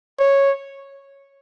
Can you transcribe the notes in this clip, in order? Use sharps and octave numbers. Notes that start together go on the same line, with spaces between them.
C#5